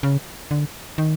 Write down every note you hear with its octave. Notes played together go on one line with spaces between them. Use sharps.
C#3
D3
D#3